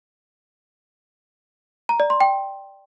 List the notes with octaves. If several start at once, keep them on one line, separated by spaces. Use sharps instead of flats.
A#5
D5
C6
G5